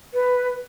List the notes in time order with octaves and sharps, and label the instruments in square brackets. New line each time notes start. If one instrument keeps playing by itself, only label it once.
[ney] B4